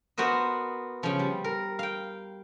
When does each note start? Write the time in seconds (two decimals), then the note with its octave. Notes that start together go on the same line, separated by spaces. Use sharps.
0.18 B3 F#4 A#4 C5 D#5
1.03 C#3 F3
1.19 G3
1.44 A#4
1.79 F5 G5